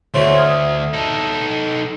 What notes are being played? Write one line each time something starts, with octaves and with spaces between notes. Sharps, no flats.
D2 A3 E4 F#4 C5 C#5 C6
D#6 F6 G#6
D#4 A4